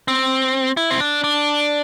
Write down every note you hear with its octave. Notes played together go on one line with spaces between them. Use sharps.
C4
E4
C4
D4
D4